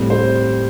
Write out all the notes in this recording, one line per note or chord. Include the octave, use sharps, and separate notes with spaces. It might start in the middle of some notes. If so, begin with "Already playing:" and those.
Already playing: A2 G3 C4
C5